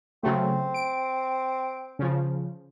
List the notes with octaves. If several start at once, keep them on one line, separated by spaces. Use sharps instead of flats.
C#3 F#3 A3 C4
D7
C#3 F3